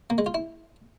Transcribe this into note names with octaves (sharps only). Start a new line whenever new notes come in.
A#3
G#3
F4
E4